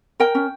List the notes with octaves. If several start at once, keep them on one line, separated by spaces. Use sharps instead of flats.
A#4 G5
C#4